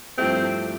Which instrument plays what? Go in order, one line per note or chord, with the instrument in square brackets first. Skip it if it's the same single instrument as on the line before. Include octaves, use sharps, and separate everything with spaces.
[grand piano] G2 F3 A3 E4 G4 [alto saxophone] C4